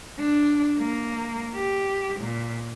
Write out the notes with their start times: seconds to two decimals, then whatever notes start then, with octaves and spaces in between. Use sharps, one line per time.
0.19 D4
0.78 A#3
1.55 G4
2.20 A#2